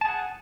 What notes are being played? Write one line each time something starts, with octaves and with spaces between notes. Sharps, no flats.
G#4 F#5 A5